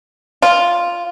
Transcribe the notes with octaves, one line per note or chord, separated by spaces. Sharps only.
F4